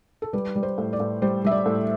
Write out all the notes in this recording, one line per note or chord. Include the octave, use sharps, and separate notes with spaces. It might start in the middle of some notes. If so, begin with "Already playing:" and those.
A4
G3 B4
G3
C5
A2
D5
A2
G3 C5
G3 E5
D5
A2